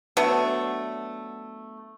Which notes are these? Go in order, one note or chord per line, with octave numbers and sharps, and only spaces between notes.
F#3 A3 B3 D4